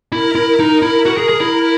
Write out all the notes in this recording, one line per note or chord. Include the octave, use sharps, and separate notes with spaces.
E4 A#4
E4
D#4 A#4
E4
F#4 A#4
G#4
G#4
E4